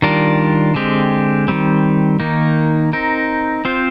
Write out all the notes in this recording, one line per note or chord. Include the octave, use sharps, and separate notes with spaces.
D#3 G3 D4 F4 A#4
D3 G#3 C4 G4
D#3 G3 C4
D#3 A#3 D#4
C4 D#4 A#4
C4 F4 C5